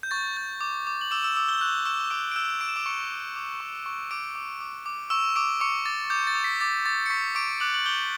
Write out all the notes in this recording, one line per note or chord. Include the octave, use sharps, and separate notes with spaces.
G6
C#6 A6
G6
D6
D6
F#7
D6 E6 E7
E6 E7
D6 E6 E7
G6 G7
C#6 F#6 F#7
C#6 E6 E7
C#6 D6 D7
D7
E6 G6 E7
C#6 D7
E7
D6 D7
C#6 C#7
D6
D6
C#6
C#6
D6 D7
D6
D6
D6
C#6 E6 E7
C#6 D6 D7
C#6 D6 C#7
D6 A6
D6 G6
A6
D6
B6
D6 A6
D6 A6
C#7
C#6 B6
C#6 D6 D7
D6 F#6 F#7
F#7
D6 G6 G7